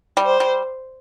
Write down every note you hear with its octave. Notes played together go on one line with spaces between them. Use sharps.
G3
C5
G3